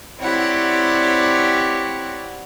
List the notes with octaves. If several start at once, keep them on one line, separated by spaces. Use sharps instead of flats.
C4 E4 G4 C#5 D5 F#5